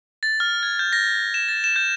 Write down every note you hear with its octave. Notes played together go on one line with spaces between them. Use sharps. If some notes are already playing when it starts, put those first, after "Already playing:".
A6
F6
G#6
G6
A#6
E7
A6
E7
G6